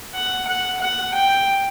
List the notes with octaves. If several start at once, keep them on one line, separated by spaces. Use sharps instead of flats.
F#5
F#5
F#5
G5